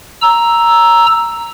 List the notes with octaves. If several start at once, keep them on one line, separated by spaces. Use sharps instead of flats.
A#5 E6